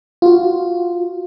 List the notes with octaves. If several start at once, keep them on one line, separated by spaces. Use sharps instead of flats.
F4 F#4